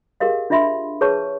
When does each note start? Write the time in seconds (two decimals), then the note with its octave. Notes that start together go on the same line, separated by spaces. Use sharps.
0.20 G4 G#4 A#4 D#5 F5
0.50 D4 F4 D#5 E5 B5 C6
1.01 G#4 B4 C#5 A5 C#6